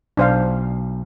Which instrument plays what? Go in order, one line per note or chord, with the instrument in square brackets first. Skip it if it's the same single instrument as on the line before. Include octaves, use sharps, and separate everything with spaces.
[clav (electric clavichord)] B1 [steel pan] D4 C5 F5